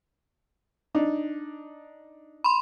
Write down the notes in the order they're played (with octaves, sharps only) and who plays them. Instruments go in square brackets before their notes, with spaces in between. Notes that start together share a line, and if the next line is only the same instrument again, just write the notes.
[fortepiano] D4 D#4
[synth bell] B5 C6